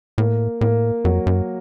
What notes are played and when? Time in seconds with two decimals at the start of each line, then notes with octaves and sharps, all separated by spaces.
0.18 A2 A#3
0.61 A2 A#3
1.04 F2 F#3
1.26 F#2